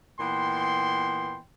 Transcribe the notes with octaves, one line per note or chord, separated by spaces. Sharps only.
A#2 E3 B3 G5 C6